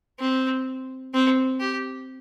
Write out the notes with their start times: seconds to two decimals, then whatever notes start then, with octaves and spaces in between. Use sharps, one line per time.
0.20 C4
1.14 C4
1.61 G4